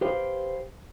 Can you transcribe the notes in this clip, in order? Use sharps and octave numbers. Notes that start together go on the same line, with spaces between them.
G4 B4 C5 F5 G5